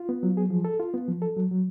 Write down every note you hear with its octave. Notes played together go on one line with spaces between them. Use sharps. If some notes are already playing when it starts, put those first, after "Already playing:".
Already playing: F4
B3
F#3
G#4
F3
A4
F4
B3
F3
A4
F#3
F#3